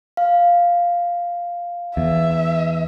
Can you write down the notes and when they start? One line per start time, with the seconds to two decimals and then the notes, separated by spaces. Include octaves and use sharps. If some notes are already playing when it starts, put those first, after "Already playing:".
0.17 F5
1.97 E2 E5